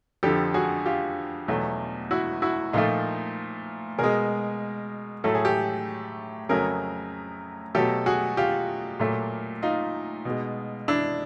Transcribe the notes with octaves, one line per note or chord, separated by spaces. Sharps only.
F2 D3 F3 G4 A4
F#4 G#4
F4 G4
E2 B2 F#3 A3
E4 F#4
E4 F#4
A#2 F3 A3 D#4 F4
B2 G#3 G#4 A#4
A2 F#3 A3 A4
G#4
G4 A4
F2 C#3 F#3 A3 G#4 A#4
B2 F#3 A3 G4 A4
F#4 G#4
F4 G4
A#2 F#3 A3
D#4 F4
B2 G#3
D4 E4